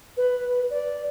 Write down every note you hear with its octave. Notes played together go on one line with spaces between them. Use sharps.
B4
D5